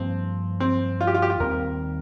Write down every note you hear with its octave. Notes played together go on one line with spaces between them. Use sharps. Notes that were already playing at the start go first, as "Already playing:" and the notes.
Already playing: G2 F3 A#3 C4
C4
F4
G4
F4
G4
F4
D#2 D#3 G3 C4 A#4